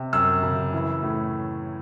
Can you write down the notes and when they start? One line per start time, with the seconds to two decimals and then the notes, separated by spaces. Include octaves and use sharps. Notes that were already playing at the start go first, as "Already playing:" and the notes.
Already playing: C3
0.13 F#2 E6
0.43 C#3
0.72 E3
1.03 A2